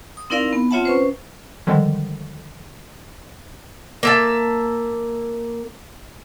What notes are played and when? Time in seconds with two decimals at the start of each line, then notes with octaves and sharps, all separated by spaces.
0.17 D#6
0.30 C4 D#4 E4 A#4 D5 F5
0.53 B3
0.71 C4 F4 C#5 E5 F#5 A5
0.85 C#4 B4 C5
1.67 D3 D#3 F3 G3 G#3
4.03 A#3 E5 A5